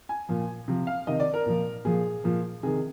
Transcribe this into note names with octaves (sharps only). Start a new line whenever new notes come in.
G#5
A#2 F3
C3 F3
F5
C3 D#3 D#5
D5
A#4
A#2 F3
A#2 F3 G#4
A#2 F3
C3 D#3 G#4